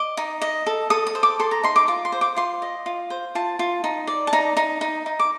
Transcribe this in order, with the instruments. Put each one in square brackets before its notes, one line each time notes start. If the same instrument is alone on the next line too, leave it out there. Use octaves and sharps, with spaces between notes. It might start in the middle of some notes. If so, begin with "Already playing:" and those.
Already playing: [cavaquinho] D#5 D6
D#4
D#5
A4
A4 D#6
D#6
C5
D6
A4 C6
A#5
D#4 C6
D6
F4 D6
C6
C5
D6
F4 C6
D#5
F4
C5
F4 A5
F4
D#4
D5
A5
D#4 A#5
D#4
D#4
D#4
D6